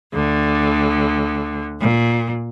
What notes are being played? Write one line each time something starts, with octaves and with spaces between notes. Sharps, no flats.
D2 D3
A#2